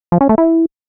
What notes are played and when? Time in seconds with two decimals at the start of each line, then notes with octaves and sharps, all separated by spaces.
0.12 F3
0.21 C#4
0.29 A3
0.38 E4